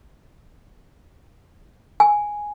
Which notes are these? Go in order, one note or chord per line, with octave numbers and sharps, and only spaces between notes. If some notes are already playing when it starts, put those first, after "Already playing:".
G#5